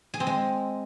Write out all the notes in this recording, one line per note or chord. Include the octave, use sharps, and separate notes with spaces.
G#4
C4
G#3